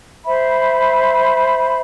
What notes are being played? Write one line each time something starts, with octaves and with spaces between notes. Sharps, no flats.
C5 E5 B5